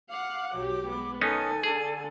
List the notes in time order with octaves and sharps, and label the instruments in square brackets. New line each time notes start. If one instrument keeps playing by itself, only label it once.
[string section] F5 F#5 [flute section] D6
[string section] B1 F#3 G4
G#3 B3
[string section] D#3 [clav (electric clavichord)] B3 C#4 D#4 [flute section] A4 G#5
[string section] D3 [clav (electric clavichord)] G#4